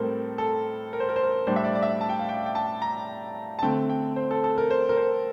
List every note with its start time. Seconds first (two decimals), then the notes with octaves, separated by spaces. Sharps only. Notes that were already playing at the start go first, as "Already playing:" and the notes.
Already playing: A2 G3 C4 A4 A#4 C5
0.38 A4
0.93 A#4
1.00 C5
1.09 A#4
1.16 C5
1.24 A#4
1.47 A2 G3 D4 C5
1.56 E5
1.65 D5
1.75 D5
1.82 E5
2.01 A5
2.09 G5
2.19 F5
2.29 G5
2.46 G5
2.55 A5
2.82 A#5
3.59 A5
3.62 D3 A3 C4 G5
3.90 G5
4.16 C5
4.31 A4
4.44 A4
4.58 A#4
4.70 C5
4.89 A#4
4.97 C5